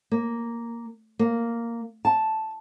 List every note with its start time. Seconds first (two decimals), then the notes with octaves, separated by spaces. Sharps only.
0.11 A#3
1.19 A#3
2.05 A5